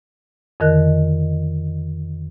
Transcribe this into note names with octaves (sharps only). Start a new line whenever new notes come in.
F2 D3 D#3 A#4 D#5 F#6